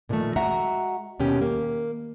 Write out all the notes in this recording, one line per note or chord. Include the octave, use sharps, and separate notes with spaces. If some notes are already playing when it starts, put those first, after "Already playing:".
A#2 D3 D#3 F3 A3
G#3 F#4 E5 F#5 A#5
D#2 B2 C#4 G4
A#3